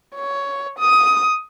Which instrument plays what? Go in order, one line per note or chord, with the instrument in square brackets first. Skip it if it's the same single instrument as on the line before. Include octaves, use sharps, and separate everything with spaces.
[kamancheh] C#5
D#6